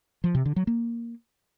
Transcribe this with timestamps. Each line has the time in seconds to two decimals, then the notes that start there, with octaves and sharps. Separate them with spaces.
0.24 F3
0.35 C3
0.45 D3
0.56 F#3
0.67 A#3